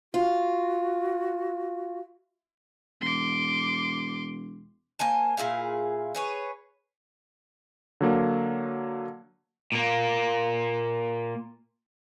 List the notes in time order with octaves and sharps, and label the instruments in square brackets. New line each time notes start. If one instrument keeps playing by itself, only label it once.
[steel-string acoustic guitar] F4 [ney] F#4
[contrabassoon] E1 [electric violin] C6 D6
[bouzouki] A#3 C5 G#5 A5
A#2 E4 G#4 F5
G#4 B4 C#5
[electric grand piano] D3 F#3 A#3
[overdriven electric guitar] A#2 A#3